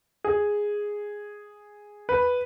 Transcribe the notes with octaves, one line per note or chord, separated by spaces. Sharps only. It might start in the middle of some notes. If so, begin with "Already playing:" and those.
G#4
B4